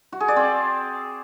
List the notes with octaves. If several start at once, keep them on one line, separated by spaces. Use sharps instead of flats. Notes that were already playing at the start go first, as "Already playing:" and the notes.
F#4
G#4
D5
C4